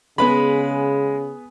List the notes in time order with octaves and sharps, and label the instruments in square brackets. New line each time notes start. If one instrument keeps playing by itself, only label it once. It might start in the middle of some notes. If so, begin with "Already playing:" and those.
[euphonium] C#3 [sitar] G#3 [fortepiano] B3 B4 B5